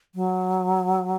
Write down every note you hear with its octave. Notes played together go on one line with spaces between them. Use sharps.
F#3